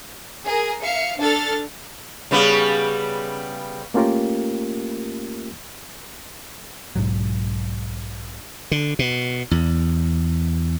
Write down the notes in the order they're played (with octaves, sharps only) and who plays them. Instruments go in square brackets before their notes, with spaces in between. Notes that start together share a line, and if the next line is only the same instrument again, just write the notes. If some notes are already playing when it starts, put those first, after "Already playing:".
[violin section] G#4 A#4
E5 F5 C#7
D4 A4 F6 A6
[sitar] C#3 G3 B3
[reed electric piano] A3 A#3 C#4 F4 G4 A#4
[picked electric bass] B1 G#2 F#3
[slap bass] D3
B2
E2